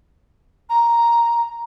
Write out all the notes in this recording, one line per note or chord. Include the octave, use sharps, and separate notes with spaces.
A#5